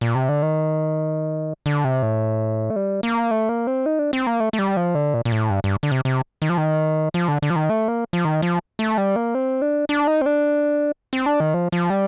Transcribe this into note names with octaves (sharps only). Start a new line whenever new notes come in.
A#2
C3
D3
D#3
D3
C3
A2
A3
G3
A#3
A3
A#3
C4
D#4
D4
C4
A#3
A3
A3
G3
F3
D3
A#2
A#2
A2
G2
G2
D3
C3
C3
D#3
F3
D#3
F3
D3
D3
F3
D#3
A3
A#3
F3
D#3
F3
A3
G3
A#3
C4
D4
D4
D#4
C4
D4
C4
D4
D#3
F3
F3
G3